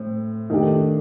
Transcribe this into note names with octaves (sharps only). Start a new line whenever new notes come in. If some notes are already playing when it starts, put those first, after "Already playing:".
Already playing: A2 C4
D#3 A3 D4 G4